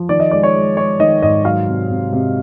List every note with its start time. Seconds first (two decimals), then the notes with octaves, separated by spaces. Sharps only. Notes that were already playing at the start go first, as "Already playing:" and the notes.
Already playing: F3
0.09 D#3 D5
0.20 D#5
0.31 G#3 D5
0.43 C#5
0.55 G#3
0.77 G#3 C#5
0.99 D#3 D#5
1.22 G#2 D#5
1.45 F#3 F5
1.67 C3
1.90 C3
2.13 C3